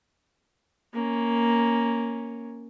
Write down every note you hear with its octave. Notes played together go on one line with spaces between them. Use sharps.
A#3 C#4